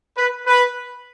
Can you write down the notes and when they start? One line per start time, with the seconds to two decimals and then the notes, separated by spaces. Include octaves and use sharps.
0.18 B4
0.47 B4